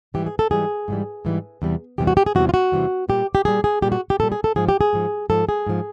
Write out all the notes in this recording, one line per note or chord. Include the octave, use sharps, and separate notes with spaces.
G#2 E3 G3 G4
G#4
A4
G#2 E3 G3 G#4
G#2 E3 G3
G#2 E3 G3
E2 C3 E3 G3
E2 C3 E3 G3 G4
F#4
G4
G#4
E2 C3 E3 G3 F#4
F4
F#4
E2 C3 E3 G3
A#2 G3 G4
G4
A#2 G3 G#4
G#4
A#2 G3 G4
F#4
G4
A#2 G3 A4
G#4
A4
G#2 F3 G#4
G4
G#4
G#2 F3
G#2 F3 A4
G#4
G#2 F3